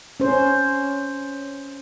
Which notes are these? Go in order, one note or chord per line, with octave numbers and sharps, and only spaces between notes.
C#4 C5